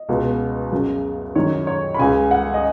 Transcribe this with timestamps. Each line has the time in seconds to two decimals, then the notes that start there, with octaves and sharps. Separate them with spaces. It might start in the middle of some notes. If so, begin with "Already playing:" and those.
Already playing: D#5
0.09 C#2 B2
0.72 F#2 C#3
1.35 F#2 D#3 C#5
1.67 C#5
1.94 B5
1.98 C#2 C#3 G#5
2.31 F#5
2.54 D#5